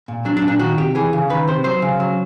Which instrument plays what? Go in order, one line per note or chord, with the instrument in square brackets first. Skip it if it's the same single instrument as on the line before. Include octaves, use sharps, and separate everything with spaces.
[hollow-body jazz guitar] A#2
F#3 D4
D4
A#2
D4
D#3 F#4
C3 G4
E3 G#4
C#3
D#3 B4
C3 C5
F#3 C5
C#3
F#3